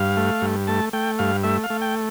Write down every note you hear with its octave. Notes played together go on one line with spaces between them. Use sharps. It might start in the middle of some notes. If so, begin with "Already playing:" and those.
Already playing: G2 F5
A3
G2
A3 A5
A3 G5
G2 F5
A3 E5
F5
A3
G5